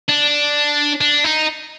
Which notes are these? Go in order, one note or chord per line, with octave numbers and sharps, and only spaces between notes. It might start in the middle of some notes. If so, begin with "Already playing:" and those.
D4
D4
D#4